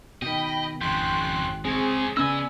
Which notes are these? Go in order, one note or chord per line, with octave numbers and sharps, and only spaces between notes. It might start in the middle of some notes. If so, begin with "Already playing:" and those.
B2 D#3 D#5 G5 B5
G#1 F2 C#3 G5 C6 F#6
G#3 C4 G#4 C#5
C#3 B3 C#4 D5 D#5 G#5 B5 E6